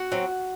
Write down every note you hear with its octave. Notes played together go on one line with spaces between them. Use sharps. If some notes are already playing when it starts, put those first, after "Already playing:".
Already playing: F#4 F#5
F#3 C4